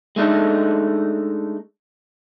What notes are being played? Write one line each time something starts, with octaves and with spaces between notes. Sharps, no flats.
G#3 A3 D4 D#4 A4